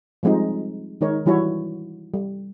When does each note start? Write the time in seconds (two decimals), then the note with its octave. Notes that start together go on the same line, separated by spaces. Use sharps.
0.23 F3 G3 G#3 C4 D#4
1.01 D#3 G#3 D#4 A#4 C#5
1.26 E3 G3 E4 F#4 C#5
2.14 G3